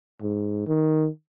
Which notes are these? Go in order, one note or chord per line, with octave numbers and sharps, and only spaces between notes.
G#2
D#3